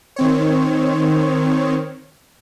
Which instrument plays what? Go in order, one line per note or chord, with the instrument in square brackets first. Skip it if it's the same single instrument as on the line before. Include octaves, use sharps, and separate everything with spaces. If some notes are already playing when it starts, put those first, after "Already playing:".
[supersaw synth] D#3 C4 C#5